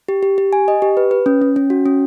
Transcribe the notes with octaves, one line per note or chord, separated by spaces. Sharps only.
G4
G4
G4
G#5
D#5
G4
B4
B4
C#4
C#4
C#4
F#4
C#4